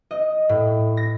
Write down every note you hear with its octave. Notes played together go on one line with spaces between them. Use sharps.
D#5
A2
A#6